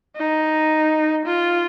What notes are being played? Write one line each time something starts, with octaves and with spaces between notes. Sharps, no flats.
D#4
F4